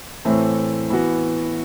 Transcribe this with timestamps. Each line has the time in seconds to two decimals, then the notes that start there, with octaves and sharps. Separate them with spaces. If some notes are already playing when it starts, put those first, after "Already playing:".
0.25 A2 E3 A3 C4
0.90 E3 B3 F#4